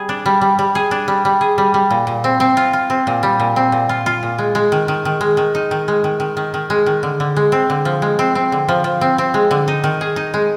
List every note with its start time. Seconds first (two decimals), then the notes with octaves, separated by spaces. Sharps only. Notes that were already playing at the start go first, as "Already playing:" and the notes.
Already playing: G3 G#4
0.09 D4
0.26 G3
0.41 G3
0.59 G3
0.75 G#4
0.91 D4
1.08 G3
1.25 G3
1.41 G#4
1.58 G3
1.74 G3
1.90 A#2
2.07 A#2
2.24 C4
2.40 C4
2.57 F4
2.73 F4
2.90 C4
3.07 A#2
3.23 G3
3.40 A#2
3.56 C4
3.72 A#2
3.89 F4
4.06 F4
4.23 A#2
4.38 G#3
4.55 G#3
4.72 D#3
4.88 D#3
5.05 D#3
5.21 G#3
5.37 D#3
5.55 D#4
5.71 D#3
5.88 G#3
6.04 D#3
6.20 D#3
6.37 D#3
6.54 D#3
6.70 G#3
6.86 D#3
7.03 D3
7.20 D3
7.36 G#3
7.52 C4
7.70 D3
7.85 F3
8.02 G#3
8.19 C4
8.35 C4
8.52 D3
8.68 F3
8.84 F3
9.01 C4
9.18 C4
9.34 G#3
9.51 D3
9.68 D#4
9.84 D#3
10.01 G#4
10.16 D#4
10.34 G#3